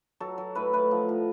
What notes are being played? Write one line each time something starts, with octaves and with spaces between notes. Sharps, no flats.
F#3 A4
F#3
A2 B4
A2 B4
F3
A2